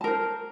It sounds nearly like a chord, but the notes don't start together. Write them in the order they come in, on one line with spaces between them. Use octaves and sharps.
A5 A#4 C5